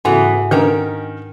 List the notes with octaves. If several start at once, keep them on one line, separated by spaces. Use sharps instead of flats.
G#2 C#3 E3 B3 F#4 A4 F#5 G#5
D#3 C#4 D4 A#4 B4 G5